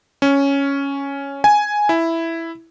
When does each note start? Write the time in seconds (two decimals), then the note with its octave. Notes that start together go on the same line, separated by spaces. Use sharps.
0.22 C#4
1.44 G#5
1.89 E4